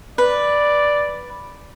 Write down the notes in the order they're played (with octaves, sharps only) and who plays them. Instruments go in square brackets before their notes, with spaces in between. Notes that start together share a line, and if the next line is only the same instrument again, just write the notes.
[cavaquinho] B4 [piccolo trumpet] D5